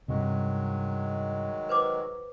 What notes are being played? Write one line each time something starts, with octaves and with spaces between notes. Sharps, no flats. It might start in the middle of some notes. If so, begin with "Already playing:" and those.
G2 C3 D#3 F#3 G#3
B4 C5 D6